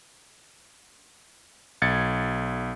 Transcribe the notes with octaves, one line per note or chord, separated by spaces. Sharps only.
B1 G#6 A6 C#7